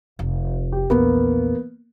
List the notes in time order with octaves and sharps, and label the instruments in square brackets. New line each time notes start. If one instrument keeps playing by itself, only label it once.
[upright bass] F1
[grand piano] G4
[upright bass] A#1 E2 [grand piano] A#3 B3